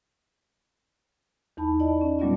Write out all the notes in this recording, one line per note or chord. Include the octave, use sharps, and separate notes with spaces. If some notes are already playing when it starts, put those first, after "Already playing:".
E2 D#4 A5 B5
E4 D5 D#5 A5
C#4
A#2 F#3 G3 B3 C#4 F4